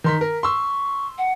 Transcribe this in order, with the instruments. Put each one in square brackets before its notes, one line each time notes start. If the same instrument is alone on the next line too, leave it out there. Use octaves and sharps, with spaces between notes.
[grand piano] D#3 C6 B6
A#4
[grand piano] C6 E6 [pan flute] C#6
[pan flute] F#5